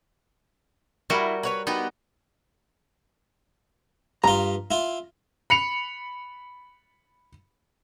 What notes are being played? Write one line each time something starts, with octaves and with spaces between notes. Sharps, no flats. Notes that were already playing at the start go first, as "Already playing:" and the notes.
G3 E4 F#4 A#4
B4 C#5 F#5
B3 D#4 F#4 G4
G2 F4 A#5
E4 F4
B5 C#7 F7